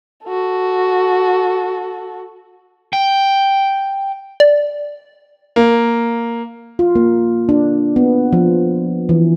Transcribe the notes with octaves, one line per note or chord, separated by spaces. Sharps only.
F#4 A4
G5
D5
A#3
F4
A#3
D4
B3
F3
E3